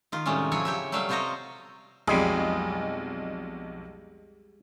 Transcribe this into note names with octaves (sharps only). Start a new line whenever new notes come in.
D#3 F4
A2 C3 D#3 G3 G#3 C#4
C#3 F3 F#3 E4 C#5 G#5
G4 C#5 E5
F#3 G3 A3 E5 F5
C3 F4 C5 C#5 D#5 A#5
B1 F2 G3 G#3 G#4